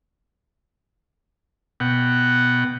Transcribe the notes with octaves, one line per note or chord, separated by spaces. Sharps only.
B2 F#5 G5